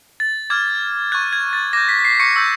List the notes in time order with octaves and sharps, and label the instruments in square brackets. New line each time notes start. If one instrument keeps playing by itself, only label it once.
[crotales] A6
D6 F6 G#6
C#6 F#6 G#6
G#6
A6
D6 G6 A#6
B6
B6
C7
C#6 C#7
C#6 E6 G6